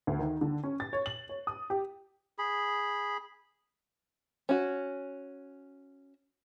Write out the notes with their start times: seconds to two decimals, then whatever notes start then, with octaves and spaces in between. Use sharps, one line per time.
0.07 D2
0.19 D#3
0.41 D3
0.64 C#4
0.80 A6
0.93 C#5
1.06 F#7
1.29 C#5
1.47 D#6
1.70 G4
2.38 G#4 B5
4.49 C#4 F#4